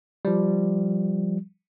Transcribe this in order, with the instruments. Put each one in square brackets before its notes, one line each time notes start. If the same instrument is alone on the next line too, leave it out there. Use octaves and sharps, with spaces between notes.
[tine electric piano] F3 G3